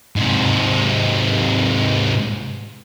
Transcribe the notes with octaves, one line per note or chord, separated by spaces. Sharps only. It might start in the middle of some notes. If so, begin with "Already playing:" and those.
G#2 C3